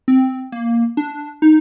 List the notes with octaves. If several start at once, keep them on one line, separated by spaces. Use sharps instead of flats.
C4
A#3
D4
D#4